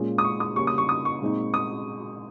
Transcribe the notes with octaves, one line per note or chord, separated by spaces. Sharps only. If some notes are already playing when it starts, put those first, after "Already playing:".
Already playing: A#2 G#3 C#4 F4
D#6
C#6
D#6
C#3 G3 A#3 C#4 C#6
D#6
C#6
D#6
C#6
A#2 G#3 C4 D#4
D#6